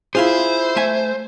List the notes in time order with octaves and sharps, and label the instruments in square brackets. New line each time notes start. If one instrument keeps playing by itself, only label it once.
[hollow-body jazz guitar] E4 F4 G#4 [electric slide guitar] C5
[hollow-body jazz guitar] A3 E5 G#5